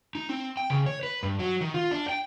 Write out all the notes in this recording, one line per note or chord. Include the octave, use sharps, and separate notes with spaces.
D#4
C4
G5
C#3
C#5
B4
G2
F#3
D#3
F4
D4
G5